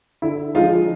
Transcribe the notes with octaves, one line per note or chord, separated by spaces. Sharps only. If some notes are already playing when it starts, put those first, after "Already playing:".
D3 E4
F3 G#3 D#4 F4